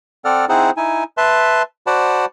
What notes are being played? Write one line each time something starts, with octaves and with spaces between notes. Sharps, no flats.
C4 A4 D5 F#5 F6
C4 D#4 E4 G#4 C5 F#5
D#4 E4 G#5
B4 E5 A5 C6
F#4 C5 D5 F#5 A5 B5